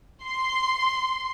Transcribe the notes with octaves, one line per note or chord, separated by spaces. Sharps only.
C6